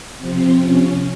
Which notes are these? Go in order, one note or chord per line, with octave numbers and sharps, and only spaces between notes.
C3 F3 C4
C#4